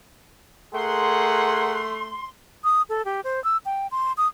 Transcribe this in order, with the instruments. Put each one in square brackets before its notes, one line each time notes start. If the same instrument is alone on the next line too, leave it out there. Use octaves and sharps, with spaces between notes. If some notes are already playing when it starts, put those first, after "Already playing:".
[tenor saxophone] A3 [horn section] G#4 A#4 F#5 [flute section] C6
[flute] D#6
A4
G4
C5
E6
G5
C6
D#6